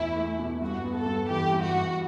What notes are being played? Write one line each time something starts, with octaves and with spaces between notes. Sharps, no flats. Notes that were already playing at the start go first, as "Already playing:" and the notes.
Already playing: E2 B2 A3 E4
A3
B2
G2 F#4
B3
A4
G2
E3 G4
G2
F#4
G2